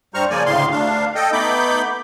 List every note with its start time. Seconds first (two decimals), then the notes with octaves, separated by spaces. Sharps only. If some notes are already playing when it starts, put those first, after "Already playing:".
0.14 G2 G3 C5 A#5 C#6 F6
0.30 C#3 F3 A#3 D5 G#5
0.46 D2 A2 C#3 F5 C6
0.71 D2 D4 F5
1.15 A4 D#5 G5
1.33 A3 B3 D#4 B5 D6 G6